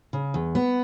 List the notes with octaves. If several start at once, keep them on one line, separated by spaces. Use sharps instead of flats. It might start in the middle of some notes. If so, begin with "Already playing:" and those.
C#3
E2
B3